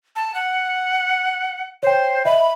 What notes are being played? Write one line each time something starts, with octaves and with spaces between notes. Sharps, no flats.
A5
F#5
C5 C#5 G5
D#5 E5 B5